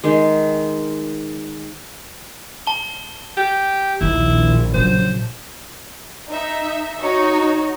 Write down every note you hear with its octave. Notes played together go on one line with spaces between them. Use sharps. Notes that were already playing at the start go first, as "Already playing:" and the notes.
D#3 G#3
A5 G7
G4
A#1 D#2 D#3 E4
C#3 F#3 C5
D#4 E5
D#4 F#4 C#5